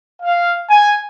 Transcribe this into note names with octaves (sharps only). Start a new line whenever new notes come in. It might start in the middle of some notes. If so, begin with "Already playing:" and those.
F5
G#5